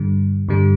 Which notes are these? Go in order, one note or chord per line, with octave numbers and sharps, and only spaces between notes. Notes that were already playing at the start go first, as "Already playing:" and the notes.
Already playing: G2 D3 G3
G2 D3 G3